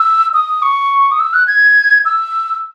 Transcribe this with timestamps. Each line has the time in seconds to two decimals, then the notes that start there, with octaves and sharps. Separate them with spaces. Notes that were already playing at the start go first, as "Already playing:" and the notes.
Already playing: E6
0.34 D#6
0.62 C#6
1.11 D#6
1.20 E6
1.33 F#6
1.47 G#6
2.05 E6